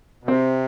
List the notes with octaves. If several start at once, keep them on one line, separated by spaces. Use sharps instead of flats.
B2
C3 C4